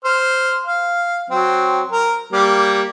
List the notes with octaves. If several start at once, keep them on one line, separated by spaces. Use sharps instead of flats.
C5 F6
F5
F#3 C4
A#4
G3 A#3